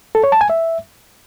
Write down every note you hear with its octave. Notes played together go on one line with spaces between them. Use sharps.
A4
C#5
A5
G#5
E5